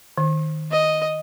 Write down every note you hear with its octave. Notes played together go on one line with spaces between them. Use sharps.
D#3
D#5